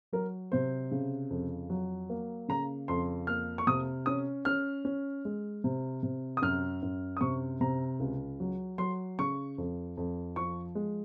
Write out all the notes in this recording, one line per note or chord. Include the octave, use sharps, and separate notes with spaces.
F#3 A#4
C3 C5
C#3
F2
F#3
A#3
C#3 A#5
F2 C6
A#3 F6
C#6
C3 D#6
C#4 D#6
C#4 F6
C#4
G#3
C3
C3
D#6
F#2 F6
F#2
D#6
C3 C#6
C3 A#5
C#2
F#3
F#3 C6
C#3 C#6
F2
F2
F3 C#6
G#3